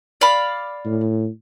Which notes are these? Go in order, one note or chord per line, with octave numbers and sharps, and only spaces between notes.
D5 F5 B5
A2